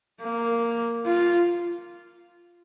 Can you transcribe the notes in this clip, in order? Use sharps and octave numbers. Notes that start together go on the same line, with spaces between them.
A#3
F4